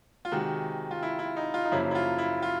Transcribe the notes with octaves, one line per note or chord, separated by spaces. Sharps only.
F4
C3 D#3 G#3 F#4
F4
E4
E4
D#4
F4
D#4
F#2 C#3 F3 A#3 C#4 E4
E4
F4
E4
F4